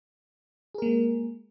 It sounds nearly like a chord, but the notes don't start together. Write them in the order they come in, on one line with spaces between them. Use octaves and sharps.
G#4 A#4 A#3 G#3